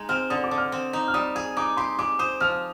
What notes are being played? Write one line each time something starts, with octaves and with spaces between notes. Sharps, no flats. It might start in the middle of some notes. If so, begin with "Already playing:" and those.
Already playing: G#3 D#4
C4 F6
D3 D#6
D6
D3
F6
C4
D#4
F6
G3 D#6
G#4 D#6
D#4 D6
G4 C6
G#3 D6
C5 D#6
F3 F6